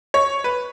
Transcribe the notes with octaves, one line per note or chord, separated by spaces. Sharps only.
C#5
B4